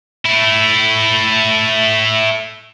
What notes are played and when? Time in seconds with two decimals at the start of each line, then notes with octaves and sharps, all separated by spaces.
0.25 A3 E4